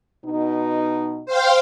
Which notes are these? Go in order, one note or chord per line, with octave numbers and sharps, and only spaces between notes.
B2 D#4
C5 F5 G5